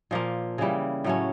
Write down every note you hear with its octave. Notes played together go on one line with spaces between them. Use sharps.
A#2 F3 A#3
C#3 E3 G3
A2 F#3 A3 C#4